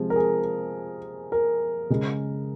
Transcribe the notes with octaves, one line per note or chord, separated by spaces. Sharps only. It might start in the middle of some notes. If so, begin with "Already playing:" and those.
Already playing: C3 F3 G#3
A#4
G#4
A#4
C#3 G#3